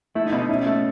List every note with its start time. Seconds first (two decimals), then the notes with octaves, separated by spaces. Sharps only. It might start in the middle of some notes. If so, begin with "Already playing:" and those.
0.15 A3 E4
0.26 D#4
0.32 B2
0.38 D#4
0.49 C#4 E4
0.66 A3